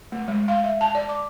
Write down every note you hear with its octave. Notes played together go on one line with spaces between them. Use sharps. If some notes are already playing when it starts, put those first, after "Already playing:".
A3
G#3
F5
E5
A5
D5
D6